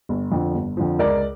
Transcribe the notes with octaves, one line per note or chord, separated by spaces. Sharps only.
G1
F2 D3 F3
G1
F2 D3 F3
C#2 A#4 D5